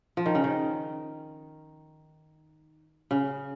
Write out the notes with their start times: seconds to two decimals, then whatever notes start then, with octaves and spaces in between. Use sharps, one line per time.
0.17 F3
0.26 D#3
0.35 C#3
0.44 D#3
3.11 C#3